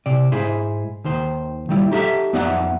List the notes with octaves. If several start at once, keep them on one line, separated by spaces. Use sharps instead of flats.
C3 D5
G#2 E4 G#4 C5
D#2 D#3 C5
D#3 G3 E4
D#4 G4 A4 E5
F2 B3 D#4 D5 E5 F#5